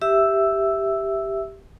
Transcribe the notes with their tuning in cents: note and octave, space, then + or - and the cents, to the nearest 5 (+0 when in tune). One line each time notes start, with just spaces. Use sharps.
G4 +0 E5 +0 E6 +0